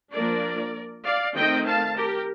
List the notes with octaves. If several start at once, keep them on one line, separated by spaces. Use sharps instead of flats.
F3 A#3 D4 A#4 D5
D5 F5
D#3 A3 C4 D#5 G5
F5 A5
G4 A#4